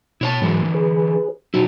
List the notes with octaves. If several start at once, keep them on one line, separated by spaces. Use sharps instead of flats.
B2 E4 C#5 A5
G#2 D3 E3 F#3 G#3 D4
G#4 B4
B2 F#3 D#4 E4 F#4